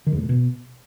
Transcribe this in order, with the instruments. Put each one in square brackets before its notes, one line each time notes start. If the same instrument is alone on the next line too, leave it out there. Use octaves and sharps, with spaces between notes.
[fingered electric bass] D#3
E2
A2
A#2
B2